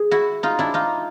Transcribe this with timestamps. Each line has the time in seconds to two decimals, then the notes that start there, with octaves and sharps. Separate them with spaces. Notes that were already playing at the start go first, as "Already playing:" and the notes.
Already playing: G#4
0.11 E4 F#4
0.43 D#4 F4
0.59 D4 E4
0.74 D#4 F4